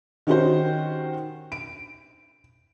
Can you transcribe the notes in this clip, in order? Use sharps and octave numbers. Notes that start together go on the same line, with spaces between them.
D#3 C#4 D#4 F#4 G4 C5
D7